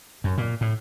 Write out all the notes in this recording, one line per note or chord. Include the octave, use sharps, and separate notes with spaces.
F#2
A#2
A2